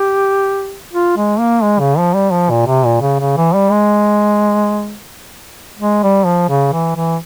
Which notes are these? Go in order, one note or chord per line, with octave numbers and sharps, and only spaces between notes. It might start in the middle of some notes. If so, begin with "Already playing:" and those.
Already playing: G4
F4
G#3
A#3
G#3
C#3
F3
G3
F3
A#2
C3
A#2
C#3
C#3
E3
G3
G#3
G#3
G3
F3
C#3
E3
E3